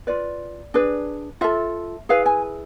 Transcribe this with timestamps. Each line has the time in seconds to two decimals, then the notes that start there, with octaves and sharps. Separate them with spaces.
0.07 F4 B4 D5
0.74 D4 G#4 B4
1.41 F4 A4 E5
2.09 E4 G#4 B4 F5
2.26 G#5